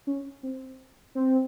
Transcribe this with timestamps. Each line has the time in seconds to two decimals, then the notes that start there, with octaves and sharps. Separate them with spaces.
0.07 C#4
0.43 C4
1.15 C4